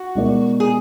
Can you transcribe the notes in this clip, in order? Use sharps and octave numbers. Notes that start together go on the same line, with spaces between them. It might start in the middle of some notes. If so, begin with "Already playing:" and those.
Already playing: F#4
B2 G#3 D#4 A#4 D5
G#4